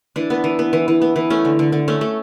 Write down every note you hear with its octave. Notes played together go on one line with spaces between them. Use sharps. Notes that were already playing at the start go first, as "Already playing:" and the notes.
E3 D4
B3
E3
B3
E3
E3
B3
E3
A3 C#4
D3
D3
D3
A3 C#4
A3